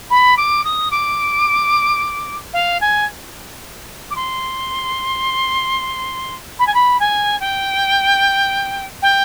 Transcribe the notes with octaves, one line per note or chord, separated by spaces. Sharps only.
B5
D6
D#6
D6
F5
G#5
D6
C6
B5
G#5
B5
G#5
G5
G5